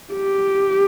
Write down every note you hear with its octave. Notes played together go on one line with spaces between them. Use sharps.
G4